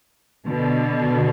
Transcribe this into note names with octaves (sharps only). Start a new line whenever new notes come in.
B2 D3